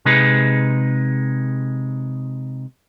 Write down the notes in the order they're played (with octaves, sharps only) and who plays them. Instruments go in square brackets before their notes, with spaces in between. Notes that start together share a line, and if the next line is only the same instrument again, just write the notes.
[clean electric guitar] C3 G#3 D#4 G#4 B4